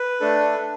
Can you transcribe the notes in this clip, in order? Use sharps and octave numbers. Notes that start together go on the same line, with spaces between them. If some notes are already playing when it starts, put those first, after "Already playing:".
Already playing: B4
A3 D4 A4